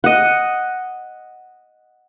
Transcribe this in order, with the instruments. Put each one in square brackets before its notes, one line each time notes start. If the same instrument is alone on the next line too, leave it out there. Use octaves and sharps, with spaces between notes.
[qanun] D#5 F#5